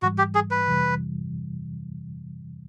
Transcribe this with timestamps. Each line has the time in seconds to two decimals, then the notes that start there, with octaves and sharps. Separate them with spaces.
0.02 G#2 E3 G3 F#4
0.18 G4
0.35 G#4
0.51 B4
0.67 F2 C3 E3 G3